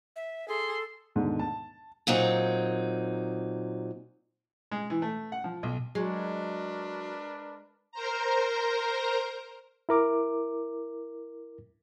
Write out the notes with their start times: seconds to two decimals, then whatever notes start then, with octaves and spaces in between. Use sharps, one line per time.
0.16 E5
0.48 G#4 A4 C6
1.15 D#2 G#2 B2 D3
1.39 A5
2.07 A#2 F#3 C4 D#4
4.71 G#3
4.90 E3
5.02 A3
5.32 F#5
5.44 F3
5.63 B1
5.95 F#3 G#3 D4 A#4 B4
7.92 A#4 C5 A#5
9.89 E4 A#4 D6